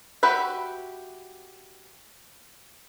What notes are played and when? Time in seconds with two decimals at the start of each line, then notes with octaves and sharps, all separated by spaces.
0.23 F#4 G4 B4 E5